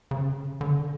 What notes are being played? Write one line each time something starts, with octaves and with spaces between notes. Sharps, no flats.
C#3
D3